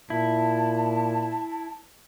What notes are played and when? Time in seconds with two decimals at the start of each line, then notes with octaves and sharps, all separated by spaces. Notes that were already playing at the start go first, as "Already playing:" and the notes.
0.10 A#2 E4 A5